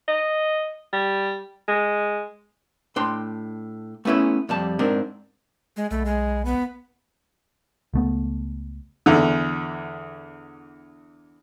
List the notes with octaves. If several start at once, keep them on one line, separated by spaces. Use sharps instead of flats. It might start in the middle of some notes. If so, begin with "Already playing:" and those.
D#5
G3
G#3
A2 D4 G5 C6
A3 B3 C#4 E4 B4
F2 G3 A5
G#2 C4 D4 A#4
G#3
B1 A3
G#3
B3
C#2 A3 B3
E2 D3